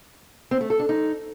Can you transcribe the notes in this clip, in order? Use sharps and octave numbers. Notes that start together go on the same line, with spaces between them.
C4
A3
A4
D4
D#4